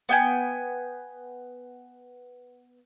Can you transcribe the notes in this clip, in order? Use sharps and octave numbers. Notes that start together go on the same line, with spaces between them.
B3 G5 G#5